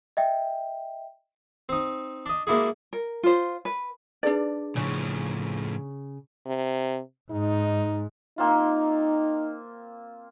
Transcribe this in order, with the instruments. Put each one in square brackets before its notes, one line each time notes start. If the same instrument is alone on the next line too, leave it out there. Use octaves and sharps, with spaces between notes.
[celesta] D#5 E5 G5
[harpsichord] C4 D#4
D4 D#5
G#3 A#3 D4 E4 F#4 G#4
[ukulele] A#4
F4 C5
B4
[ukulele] D4 D5 [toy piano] D#4 G#4 B4
[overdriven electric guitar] A2 F3 [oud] C#3
[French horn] C3
[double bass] G#2 [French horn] D#4
[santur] A#3 C4 F4 [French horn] D#4